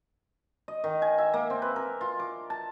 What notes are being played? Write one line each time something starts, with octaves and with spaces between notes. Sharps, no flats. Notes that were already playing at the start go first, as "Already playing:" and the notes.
D#5
D#3
G#5
E5
A#3
C4
B4
A#4
F4
D6
A5